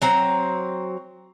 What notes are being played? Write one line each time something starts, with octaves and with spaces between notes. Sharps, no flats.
F#3 C4 A#5